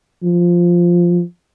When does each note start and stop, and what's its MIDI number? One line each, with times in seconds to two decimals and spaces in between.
0.23 1.22 53